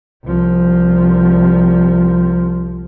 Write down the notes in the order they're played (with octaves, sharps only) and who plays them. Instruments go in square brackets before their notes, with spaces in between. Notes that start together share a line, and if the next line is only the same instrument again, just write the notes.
[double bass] C2 F3